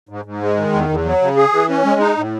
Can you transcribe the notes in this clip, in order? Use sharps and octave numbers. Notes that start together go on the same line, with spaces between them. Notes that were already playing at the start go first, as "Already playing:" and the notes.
G#2
G#2
G#3
D#3
E2
E2
F#3
C#3
G#4
E3
C#4
G#3
D#4
A2